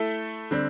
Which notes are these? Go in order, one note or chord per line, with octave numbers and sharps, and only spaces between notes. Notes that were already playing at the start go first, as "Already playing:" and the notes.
Already playing: A3 E4 A4 E5
D3 G3 C4